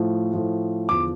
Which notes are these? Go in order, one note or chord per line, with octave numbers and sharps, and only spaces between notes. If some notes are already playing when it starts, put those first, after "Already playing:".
Already playing: A2 F3
A2 F3
E2 D3 F3 D6